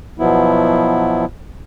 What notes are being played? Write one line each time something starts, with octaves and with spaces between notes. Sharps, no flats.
B2 F3 F#3 B3 E4